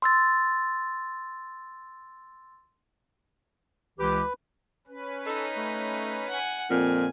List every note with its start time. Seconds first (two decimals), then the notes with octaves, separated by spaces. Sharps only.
0.02 C6 E6 A6
3.99 C#2 E3 G4 B4
4.87 C#4 B4
5.26 D#4 A4
5.57 A3
6.29 F#5 G#5
6.70 F2 A#2 G#5